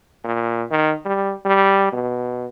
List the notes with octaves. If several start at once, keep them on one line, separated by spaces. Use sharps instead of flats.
A#2
D#3
G3
G3
B2